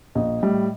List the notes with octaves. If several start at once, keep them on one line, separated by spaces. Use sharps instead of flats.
A#1 D#5
A2 G3